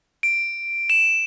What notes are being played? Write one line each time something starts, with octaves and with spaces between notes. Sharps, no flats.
D7
E7